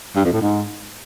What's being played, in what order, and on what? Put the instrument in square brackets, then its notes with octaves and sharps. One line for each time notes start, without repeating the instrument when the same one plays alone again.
[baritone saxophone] G2
F2
A2
G#2